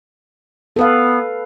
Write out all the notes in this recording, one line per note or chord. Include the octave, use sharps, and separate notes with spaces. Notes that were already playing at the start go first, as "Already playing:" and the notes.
B3 A4 B4 F5